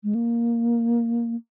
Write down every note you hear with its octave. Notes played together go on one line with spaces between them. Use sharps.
G#3
A#3